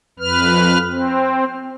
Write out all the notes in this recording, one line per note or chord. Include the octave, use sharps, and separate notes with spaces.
F2 B4 F6
C4